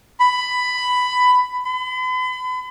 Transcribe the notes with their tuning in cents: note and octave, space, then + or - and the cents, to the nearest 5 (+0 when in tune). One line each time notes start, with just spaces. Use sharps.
B5 +10
B5 +40